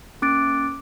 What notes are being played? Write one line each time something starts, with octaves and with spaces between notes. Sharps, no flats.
A#3 C#4 D6 F#6 A6 D7